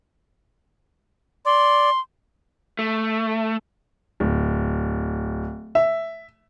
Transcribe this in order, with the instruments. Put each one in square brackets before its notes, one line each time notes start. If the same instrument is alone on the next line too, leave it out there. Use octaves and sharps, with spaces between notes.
[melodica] D5 [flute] C6
[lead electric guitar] A3
[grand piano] D1
E5